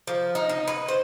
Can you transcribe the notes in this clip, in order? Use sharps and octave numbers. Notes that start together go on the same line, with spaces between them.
F3
D#4
D#4
B4
C5